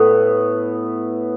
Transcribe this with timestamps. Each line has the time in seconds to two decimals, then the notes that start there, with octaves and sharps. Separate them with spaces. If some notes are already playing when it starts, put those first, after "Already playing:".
Already playing: A2 B3